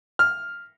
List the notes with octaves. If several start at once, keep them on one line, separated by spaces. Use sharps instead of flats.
F6